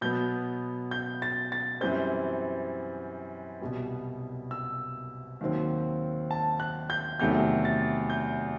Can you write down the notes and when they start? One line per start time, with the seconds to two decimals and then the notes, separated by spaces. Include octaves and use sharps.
0.01 B2 F#3 B3 G6
0.91 G6
1.22 A6
1.52 A6
1.81 F#2 E3 G3 C4 G6
3.61 C2 B2 G3 B3
4.51 E6
5.41 D#2 D#3 F#3 C4
6.31 A5
6.60 F#6
6.90 G6
7.20 E2 C3 D#3 F#3 A3 G6
7.65 A6
8.10 G6